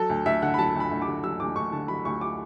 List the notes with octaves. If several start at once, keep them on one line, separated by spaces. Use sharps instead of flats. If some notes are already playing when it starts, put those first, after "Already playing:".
Already playing: F#3 A4
D2
D2 E5
D3 F#5
B5
F#3 A5
D2
B5
D2
D6
D3
F#3 E6
D2 D6
D2 C#6
D3 A5
F#3 B5
D2 C#6
D6